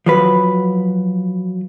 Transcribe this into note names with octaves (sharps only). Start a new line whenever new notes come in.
F3 F#3 B4